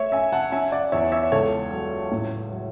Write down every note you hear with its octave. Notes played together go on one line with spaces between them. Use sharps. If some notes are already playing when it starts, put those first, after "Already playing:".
Already playing: A3 C#5 E5
C#4 E5 G#5
F#5 A5
C#4 E5 G#5
D5 F#5
E2 C#5 E5
C#5 E5
C#2 A4 C#5
F#3
A2
F#3